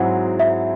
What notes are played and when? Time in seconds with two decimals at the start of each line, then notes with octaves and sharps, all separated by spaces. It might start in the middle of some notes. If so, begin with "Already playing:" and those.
Already playing: G#2 F#3 C4 E4 G#4 F#5
0.40 E5